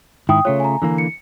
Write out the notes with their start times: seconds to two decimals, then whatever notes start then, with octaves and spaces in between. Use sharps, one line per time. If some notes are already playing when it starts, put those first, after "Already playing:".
0.29 G#2 D#3 E4 G5 D#6
0.45 C#3 A3 F4 C#5
0.60 G#5 A#5
0.82 D3 E3 A#3
0.98 C#7